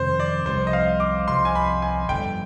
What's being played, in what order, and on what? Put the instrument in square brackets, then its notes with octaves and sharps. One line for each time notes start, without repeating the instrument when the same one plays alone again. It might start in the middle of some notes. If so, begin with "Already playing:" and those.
Already playing: [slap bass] F2 C3 D#3 G3 [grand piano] C5
[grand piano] D5
[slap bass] C2 C3 F3 [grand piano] C5
[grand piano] D#5
F5
D6
[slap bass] C2 C3 F3 [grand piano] C6
[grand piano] G#5
B5
G#5
[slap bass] G1 F2 D3 [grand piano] G5